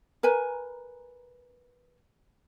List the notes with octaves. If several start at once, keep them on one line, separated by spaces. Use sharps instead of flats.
A#4 B4 G#5